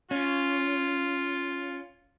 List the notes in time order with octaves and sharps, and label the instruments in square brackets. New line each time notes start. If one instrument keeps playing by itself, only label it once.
[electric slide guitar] C#4 [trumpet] F4